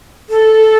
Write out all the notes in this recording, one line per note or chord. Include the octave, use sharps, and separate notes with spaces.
A4